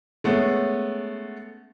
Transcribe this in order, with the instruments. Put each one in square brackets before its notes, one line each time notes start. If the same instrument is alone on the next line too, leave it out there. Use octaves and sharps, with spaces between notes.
[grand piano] G#3 A3 B3 C#4